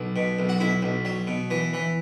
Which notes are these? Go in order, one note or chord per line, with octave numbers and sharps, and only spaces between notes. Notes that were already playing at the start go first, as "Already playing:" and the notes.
Already playing: B1
B2
B1
F#4
B1 E4
B1
F#3
B2
E3
E3